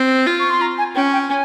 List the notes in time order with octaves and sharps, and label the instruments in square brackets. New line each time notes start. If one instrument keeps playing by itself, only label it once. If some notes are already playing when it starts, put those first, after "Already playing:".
Already playing: [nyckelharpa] C4
F4
[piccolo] C#6
C6
A#5
G#5
[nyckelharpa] C#4 [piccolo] G5
[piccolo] G5
G#5